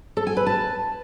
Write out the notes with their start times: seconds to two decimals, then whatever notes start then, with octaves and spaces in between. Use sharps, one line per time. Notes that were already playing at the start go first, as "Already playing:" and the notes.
0.17 A4
0.27 G#5
0.37 B4
0.46 A5